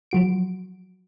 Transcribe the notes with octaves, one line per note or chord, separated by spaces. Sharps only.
F3 F#3 F#4 D7